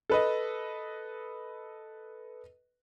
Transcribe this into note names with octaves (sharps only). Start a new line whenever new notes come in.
A4 B4 D#5